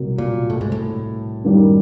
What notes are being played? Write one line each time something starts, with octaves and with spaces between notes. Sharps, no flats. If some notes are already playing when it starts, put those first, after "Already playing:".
Already playing: C2 B2 F#3 A#3
A#2
A2
G#2
A2
F#2 D#3 G3